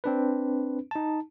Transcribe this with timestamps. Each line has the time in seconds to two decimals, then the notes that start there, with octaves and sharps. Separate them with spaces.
0.04 C4 D4 B4
0.91 D#4 A5